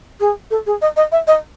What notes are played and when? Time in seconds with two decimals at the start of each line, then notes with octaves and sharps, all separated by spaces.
0.20 G#4
0.51 A4
0.66 G#4
0.82 D#5
0.96 D#5
1.12 E5
1.27 D#5